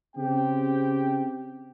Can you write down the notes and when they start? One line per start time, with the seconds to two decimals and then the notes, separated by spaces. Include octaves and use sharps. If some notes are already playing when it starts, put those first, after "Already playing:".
0.16 C#3 C4 G4 G5